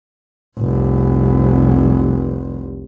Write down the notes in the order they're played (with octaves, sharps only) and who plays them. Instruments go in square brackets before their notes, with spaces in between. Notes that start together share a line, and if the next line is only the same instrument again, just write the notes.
[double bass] F1 C2